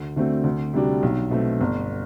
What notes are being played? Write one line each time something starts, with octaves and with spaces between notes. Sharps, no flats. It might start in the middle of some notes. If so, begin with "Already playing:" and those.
Already playing: D2
D3 A3 C4 F#4
D2
C3 G3 D4 F#4
B1
B2 A3 C4
G1